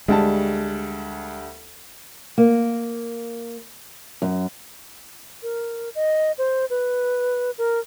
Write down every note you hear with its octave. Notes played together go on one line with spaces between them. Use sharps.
D2 G3 G#3 A5
A#3
F#2
A#4
D#5
C5
B4
A#4